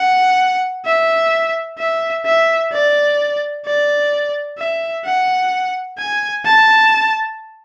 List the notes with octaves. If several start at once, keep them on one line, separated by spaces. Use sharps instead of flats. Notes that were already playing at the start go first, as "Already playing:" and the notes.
Already playing: F#5
E5
E5
E5
D5
D5
E5
F#5
G#5
A5